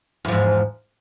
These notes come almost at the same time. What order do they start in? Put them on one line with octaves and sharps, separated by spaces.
E2 F3 G#2